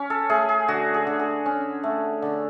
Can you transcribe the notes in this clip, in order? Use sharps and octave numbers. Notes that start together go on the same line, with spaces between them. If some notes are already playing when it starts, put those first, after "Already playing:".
Already playing: C#4
A4
A3 G#4
G#4
D3 F#4
G#4
D3
G#4
C#4
A3
D3